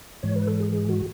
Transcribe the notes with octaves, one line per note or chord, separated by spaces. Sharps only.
G#2 E3 G#3 C#5
B4
A4
G#4
G#4
F#4